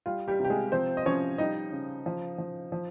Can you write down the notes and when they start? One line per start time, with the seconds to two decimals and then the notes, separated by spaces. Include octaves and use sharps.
0.06 G3 F4
0.28 G3 G4
0.40 C3 G4
0.50 G#3 G#4
0.72 F3 C4 C5
0.97 D#5
1.06 F3 C#4 C#5
1.38 G3 D#4 D#5
1.72 C#3
2.06 F3
2.38 F3
2.72 F3